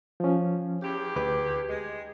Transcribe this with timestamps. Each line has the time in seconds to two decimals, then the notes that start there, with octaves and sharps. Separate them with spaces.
0.20 F3 C#4
0.82 E2 G4
1.16 D2 B4 D6
1.69 G#3